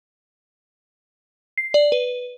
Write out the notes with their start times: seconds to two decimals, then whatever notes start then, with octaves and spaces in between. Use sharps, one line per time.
1.58 C7
1.74 D5
1.92 B4